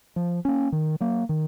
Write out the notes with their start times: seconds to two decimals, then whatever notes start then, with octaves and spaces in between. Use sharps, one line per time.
0.16 F3
0.45 A#3 C#4
0.72 D#3
1.00 F#3 A#3
1.29 D#3